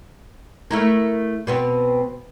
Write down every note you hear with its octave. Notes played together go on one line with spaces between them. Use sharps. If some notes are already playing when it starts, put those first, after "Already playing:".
A3 E4 A#4
B2 B3 C4